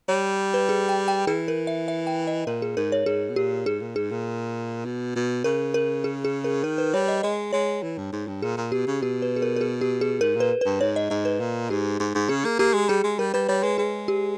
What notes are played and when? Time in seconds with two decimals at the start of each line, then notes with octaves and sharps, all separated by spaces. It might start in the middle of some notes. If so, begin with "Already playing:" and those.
0.08 G3 C#5
0.54 B4
0.69 G#4
0.89 G5
1.08 G5
1.27 E3 G#4
1.48 A#4
1.67 E5
1.88 E5
2.07 G5
2.27 D#5
2.47 A#2 A#4
2.62 G#4
2.77 G#2 A#4
2.92 C#5
3.06 G#2 G#4
3.29 B2
3.36 A#2 G4
3.66 G#2 G#4
3.81 A#2
3.96 G#2 G#4
4.11 A#2
4.85 B2
5.16 B2
5.44 C#3 A#4
5.74 A#4
6.04 G#4
6.25 G#4
6.44 A#4
6.63 D#3 A#4
6.78 B4
6.94 G3 C#5
7.08 D#5
7.23 G#3 D#5
7.53 G#3 C#5
7.83 E3
7.98 G2
8.12 G#2
8.28 G2
8.42 A#2 G#4
8.57 A#2
8.72 B2 G4
8.87 C#3
9.02 B2 G4
9.22 B4
9.36 G#4
9.42 A#4
9.56 A#4
9.61 G#4
9.81 G4
10.01 G#4
10.21 G#2 A#4
10.36 A#2 B4
10.61 B4
10.66 G2
10.81 G#2 C#5
10.96 D#5
11.10 G#2 D#5
11.25 B4
11.40 A#2
11.70 G#2 G4
12.00 G#2
12.15 G#2
12.29 C#3 G#4
12.45 A#3
12.59 A#3 G4
12.74 G#3
12.89 G3 G#4
13.04 G#3
13.19 G3 A#4
13.34 G3 B4
13.49 G3 C#5
13.63 G#3 B4
13.78 G#3 G#4
14.08 G4